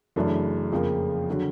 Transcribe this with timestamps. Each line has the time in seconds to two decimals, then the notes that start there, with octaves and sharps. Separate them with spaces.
0.16 F#2 C#3 E3 A3 D4
0.72 F2 C#3 F3 A#3
1.30 D3 F#3